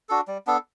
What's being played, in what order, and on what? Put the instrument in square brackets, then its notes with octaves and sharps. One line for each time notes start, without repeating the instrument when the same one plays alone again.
[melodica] D4 F#4 A4
G3
B3 D4 A4